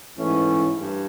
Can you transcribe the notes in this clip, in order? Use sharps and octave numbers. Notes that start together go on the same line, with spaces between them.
G#2 E3 A3 C#4
G2